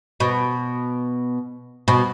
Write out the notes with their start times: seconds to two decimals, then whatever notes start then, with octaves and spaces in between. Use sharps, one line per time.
0.20 B2
1.88 B2